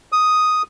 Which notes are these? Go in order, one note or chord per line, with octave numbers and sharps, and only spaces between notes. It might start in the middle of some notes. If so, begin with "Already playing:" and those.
D#6